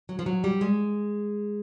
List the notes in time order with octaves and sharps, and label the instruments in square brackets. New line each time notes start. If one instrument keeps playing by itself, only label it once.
[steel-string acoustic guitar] F#3
F3
F#3
G3
G#3